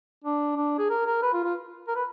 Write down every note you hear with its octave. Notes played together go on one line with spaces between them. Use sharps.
D4
D4
G#4
A#4
A#4
B4
F4
F4
A#4
B4